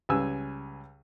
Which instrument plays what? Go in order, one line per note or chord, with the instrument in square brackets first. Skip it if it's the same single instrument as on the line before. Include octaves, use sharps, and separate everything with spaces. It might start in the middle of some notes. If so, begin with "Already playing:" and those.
[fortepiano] C#2 G3 B4 G#5 E6